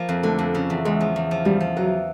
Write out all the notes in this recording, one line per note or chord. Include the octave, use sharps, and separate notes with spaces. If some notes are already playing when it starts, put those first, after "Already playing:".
Already playing: F3 A#3
F2
D3 A3
F2
C#3
E2
E2 G#3
F3
E2
F3
E2 G3
F3
E3 F#3